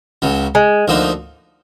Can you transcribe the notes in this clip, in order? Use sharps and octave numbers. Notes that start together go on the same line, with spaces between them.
C#2 C#3 F#3
G#3
D2 D3 F3 A#3 D#4